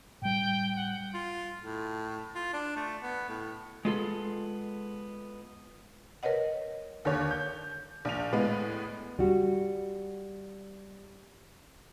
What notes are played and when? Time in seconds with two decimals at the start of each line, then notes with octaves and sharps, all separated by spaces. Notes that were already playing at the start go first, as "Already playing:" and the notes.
0.22 A2 G3 G5
0.76 F#5
1.14 F4
1.61 A2
2.36 F4
2.53 D4
2.76 A3
3.03 B3
3.29 A2
3.85 G#3 B3 F4 G#4 A4
6.23 A#4 B4 C#5 D#5 F#5
7.05 D#2 D3 C#5
7.31 G6
8.05 A#1 F7
8.32 A2 G#3 B3
9.19 G3 F#4